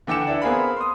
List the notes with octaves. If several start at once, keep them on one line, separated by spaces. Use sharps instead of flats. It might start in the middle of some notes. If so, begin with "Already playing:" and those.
D3 E3 G5 D6 C#7 E7
D4 E4 B4
B3 C4 G#4 A#4 F5 B5
C6 D#6